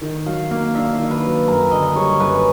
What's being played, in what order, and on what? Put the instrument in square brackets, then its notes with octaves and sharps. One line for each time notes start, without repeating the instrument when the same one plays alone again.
[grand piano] D#3
[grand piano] F#3 [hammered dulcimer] F5
[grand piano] A#3 [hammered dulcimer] F5
[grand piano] D4 [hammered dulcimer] E5
[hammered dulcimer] F5
[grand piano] D#3 [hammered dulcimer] E5
[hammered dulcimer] B4
[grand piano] F#3
[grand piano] F#2 [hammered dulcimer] A#4
[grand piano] D3 [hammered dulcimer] D#5
[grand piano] G3 [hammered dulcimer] C#5
[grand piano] F#2 [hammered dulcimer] B4